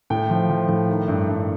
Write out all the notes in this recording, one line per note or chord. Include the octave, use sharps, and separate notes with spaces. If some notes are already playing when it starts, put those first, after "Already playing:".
A2 G5
F3
F3
A2
D#3
G2
G2